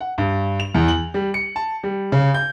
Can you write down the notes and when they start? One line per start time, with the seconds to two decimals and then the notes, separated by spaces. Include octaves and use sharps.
0.01 F#5
0.18 G2
0.60 F7
0.74 E2
0.88 F#7
1.14 G3
1.34 C#7
1.56 A5
1.83 G3
2.12 C#3
2.34 G6